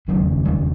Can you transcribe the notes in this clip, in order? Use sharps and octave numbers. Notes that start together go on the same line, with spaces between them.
E1 D#2 C#3 F#3
E1 D#2 C#3 G3